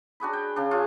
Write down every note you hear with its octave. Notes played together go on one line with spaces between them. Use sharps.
D4 F#4 G#4 B5
G5
C#3 D4
F4 G#4 C#5